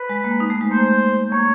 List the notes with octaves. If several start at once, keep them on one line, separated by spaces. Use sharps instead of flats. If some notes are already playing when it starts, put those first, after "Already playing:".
Already playing: B4
G#3
A#3
D#4
A3
G#3
A#3 C5
A#3 C#5